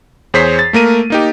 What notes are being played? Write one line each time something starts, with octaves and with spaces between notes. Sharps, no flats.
E2 G#4 C5 C#5 B6 C7
A6
A3 A#3 A#4 D#7
A#3 D#4 G4